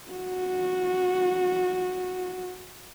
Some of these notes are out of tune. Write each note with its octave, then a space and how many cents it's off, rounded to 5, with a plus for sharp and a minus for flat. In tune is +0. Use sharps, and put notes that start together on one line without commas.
F#4 -15